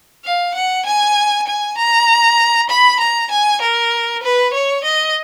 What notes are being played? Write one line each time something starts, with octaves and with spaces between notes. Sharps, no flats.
F5
F#5
G#5
G#5
A#5
B5
A#5
G#5
A#4
B4
C#5
D#5